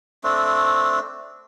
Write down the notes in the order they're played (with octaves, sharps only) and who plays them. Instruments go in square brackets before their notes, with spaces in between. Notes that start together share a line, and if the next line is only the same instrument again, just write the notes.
[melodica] A3 C4 D4